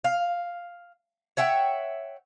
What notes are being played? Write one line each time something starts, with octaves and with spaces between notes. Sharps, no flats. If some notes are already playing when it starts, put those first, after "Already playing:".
F5
C#5 E5 F#5 G5